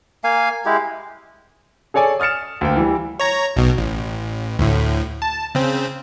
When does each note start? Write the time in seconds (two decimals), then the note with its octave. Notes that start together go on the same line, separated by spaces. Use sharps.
0.24 A#3 F5 G#5
0.65 G#3 E4 G4
1.94 G#4 A4 C#5 D5 G#5
2.20 D#6 F6 A6 C#7 E7
2.61 D2 A#3 G5
2.76 E3 G3
3.20 C#5 A#5
3.56 B1 B2
3.78 A1
4.59 D2 A2
5.22 A5
5.55 C#3 C4